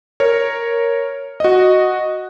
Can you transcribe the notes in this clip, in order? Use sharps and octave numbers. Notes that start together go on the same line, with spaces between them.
A#4 C#5
F#4 D#5